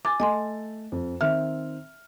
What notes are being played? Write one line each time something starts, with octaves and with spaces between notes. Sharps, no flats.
G#5 D6 A6
A3 D#5 G#5 C6
F2
D#3 C4 E5 F6